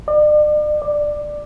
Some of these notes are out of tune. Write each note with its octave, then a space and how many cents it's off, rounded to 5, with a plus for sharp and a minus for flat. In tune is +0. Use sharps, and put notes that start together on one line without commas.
D5 +40
D5 +10